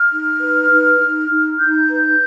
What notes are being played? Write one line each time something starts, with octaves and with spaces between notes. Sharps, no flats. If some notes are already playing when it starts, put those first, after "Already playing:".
Already playing: F6
D#4
B4
D#4
D#4
D#4
D#4 G6
B4